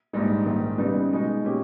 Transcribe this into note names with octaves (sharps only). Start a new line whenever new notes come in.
A#1 G#2 G3 A#3 D#4
A#1 G#2 D#3
C#3 G3 B3 D#4
B2 G#3 D#4
A#2 A#3 C#4 G4